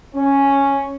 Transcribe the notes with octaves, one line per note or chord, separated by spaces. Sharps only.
C#4